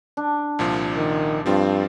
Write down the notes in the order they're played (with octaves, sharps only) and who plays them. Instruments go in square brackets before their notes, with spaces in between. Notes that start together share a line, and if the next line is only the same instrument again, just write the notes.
[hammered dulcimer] D4
[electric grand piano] C2 A#2 F3
[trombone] D#3
[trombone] G2 [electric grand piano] F3 C4 F4